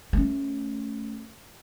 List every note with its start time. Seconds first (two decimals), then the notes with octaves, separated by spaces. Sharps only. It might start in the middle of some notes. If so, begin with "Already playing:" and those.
0.13 A3 C#4